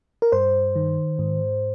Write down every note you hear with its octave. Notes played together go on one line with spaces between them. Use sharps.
A#4
G2 C5
D#3
G#2